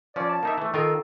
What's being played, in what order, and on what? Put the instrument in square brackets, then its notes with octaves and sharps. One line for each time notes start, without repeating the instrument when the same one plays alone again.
[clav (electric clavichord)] F3 C#4 [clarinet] D5
[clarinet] A5
[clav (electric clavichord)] A#3 D#4 E5
E3 A3
[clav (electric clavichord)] D#3 F4 A#4 [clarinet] A4